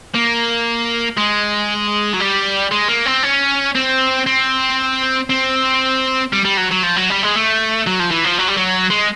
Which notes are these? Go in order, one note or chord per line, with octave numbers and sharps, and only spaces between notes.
A#3
G#3
F#3
G3
G#3
A#3
C4
C#4
C4
C4
C4
G3
G3
F#3
F#3
F3
F#3
G3
G#3
A3
F#3
F3
E3
F3
F#3
G3
F#3
G#3